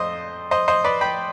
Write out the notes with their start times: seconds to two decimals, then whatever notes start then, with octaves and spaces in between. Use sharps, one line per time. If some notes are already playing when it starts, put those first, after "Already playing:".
Already playing: F2 C5 D#5
0.51 C5 D#5
0.68 C5 D#5
0.84 B4 D5
1.01 G5 B5